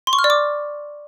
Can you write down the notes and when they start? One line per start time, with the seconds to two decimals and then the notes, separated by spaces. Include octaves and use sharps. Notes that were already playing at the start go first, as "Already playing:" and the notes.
0.07 C6
0.13 C#6
0.19 F6
0.24 D5
0.30 D6